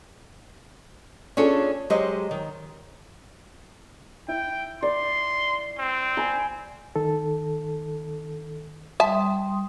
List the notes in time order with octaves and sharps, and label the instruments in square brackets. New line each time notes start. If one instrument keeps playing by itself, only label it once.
[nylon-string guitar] C#4 D4 F4 G#4 A4 C#5
F#3 G#3 G4 C5 D#5
D#3
[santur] E4 [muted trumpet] G5
[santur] D5 [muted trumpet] C6
[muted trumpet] C4
[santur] G#5 B5
[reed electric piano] D#3 A4
[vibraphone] G3 C6 D#6 [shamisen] E5 A5